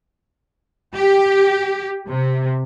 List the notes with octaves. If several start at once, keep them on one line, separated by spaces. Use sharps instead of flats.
G4
C3